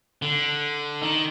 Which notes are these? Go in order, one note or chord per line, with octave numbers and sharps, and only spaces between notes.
D3
D#3